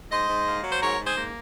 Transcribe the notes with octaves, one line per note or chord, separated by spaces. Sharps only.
G#2 C5 D#5
G#2
A#3
F#3
C5
G#2 A#4 C#5
G#2
G#4 C5
A#3